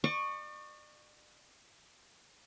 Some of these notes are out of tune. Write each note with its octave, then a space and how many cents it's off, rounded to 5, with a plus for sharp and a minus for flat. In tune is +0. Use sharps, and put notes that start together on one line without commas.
D5 +40 C#6 +0